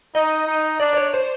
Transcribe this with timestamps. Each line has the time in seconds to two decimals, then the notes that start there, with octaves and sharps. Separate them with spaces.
0.15 D#4 D#5
0.47 D#4
0.80 D4 D5
0.93 D5
0.97 C#5
1.14 C5